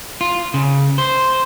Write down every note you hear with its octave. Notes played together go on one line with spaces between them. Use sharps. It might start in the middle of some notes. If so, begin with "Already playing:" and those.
F4
C#3
C5